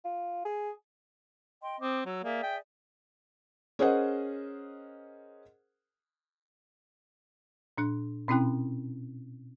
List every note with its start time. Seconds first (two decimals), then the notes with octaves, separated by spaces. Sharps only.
0.05 F4
0.45 G#4
1.62 D#5 G5 C6
1.81 C4 D6 D#6
2.06 F#3 E6
2.23 A#3 G#4 D5 E5
2.43 G5
3.79 C#4 G#4 A#4 C5 D#5 F#5
7.78 A#2 D4 F#6
8.28 B2 C4 C#4 E4 G5 F#6